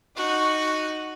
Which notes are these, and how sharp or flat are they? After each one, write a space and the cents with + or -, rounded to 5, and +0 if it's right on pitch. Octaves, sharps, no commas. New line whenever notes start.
D#4 +0 F#4 +0